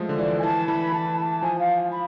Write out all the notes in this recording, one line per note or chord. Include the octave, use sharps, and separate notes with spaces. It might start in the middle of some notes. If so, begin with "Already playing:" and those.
Already playing: F3 G#3 A3
D3
E3 D5
G#5
E3 A5
E3 B5
E3 A5
A5
F3 G#5
F5
B5